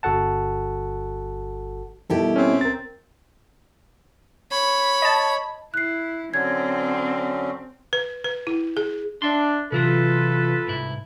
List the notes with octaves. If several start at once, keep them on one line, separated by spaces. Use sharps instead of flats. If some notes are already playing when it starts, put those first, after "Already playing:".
G1 F#4 A4 F#5 A5
B2 G3 E4 G4 A4 A#4
C4 C#4
C#2 A#4 A6
C#5 B5
D#5 A5
E4 F#6 C7
D3 F#3 C4 C#4 G#6
B4
B4
E4
G#4
D4 E5 C6
C3 E3 F#3 F4 A4 B4
C2 G#2 E4